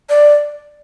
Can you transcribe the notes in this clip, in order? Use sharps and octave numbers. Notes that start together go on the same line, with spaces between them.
D5